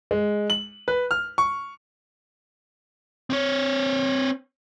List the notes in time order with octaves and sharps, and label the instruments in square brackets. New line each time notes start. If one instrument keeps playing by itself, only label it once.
[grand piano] G#3
F#7
B4
F6
C#6
[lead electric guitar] C4 C#5